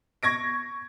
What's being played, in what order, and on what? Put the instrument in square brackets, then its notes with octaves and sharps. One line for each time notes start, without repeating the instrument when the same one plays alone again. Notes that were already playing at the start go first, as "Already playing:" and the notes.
[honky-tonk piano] C#6 G#6 A#6 D7